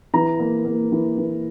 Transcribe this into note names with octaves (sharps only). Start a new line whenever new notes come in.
E3 A#5
A#3
A#3
E3
E3